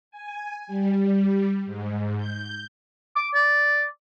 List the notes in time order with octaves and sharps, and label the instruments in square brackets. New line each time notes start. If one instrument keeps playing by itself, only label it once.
[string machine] G#5
G3
G#2
G6
[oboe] D6
D5